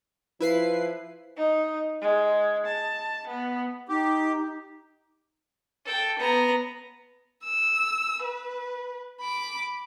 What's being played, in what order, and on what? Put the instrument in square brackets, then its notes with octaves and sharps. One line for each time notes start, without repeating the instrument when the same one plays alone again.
[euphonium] F3 [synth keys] E4 B4 C7
[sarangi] D#4
G#3
A5
B3
[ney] D#4 [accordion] G4
[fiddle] A4 G5
B3 A#5
[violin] E6
B4
B5 D6